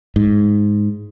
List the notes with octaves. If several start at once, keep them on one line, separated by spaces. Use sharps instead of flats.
G#2